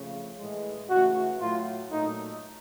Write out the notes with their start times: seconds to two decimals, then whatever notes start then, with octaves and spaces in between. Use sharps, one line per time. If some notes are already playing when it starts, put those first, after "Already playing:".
Already playing: C#3 F3 A3
0.38 A2 E3 G#3
0.89 C#3 E3 A3 F#4
1.40 A2 F#3 A3 F4
1.91 A#2 F#3 A3 D#4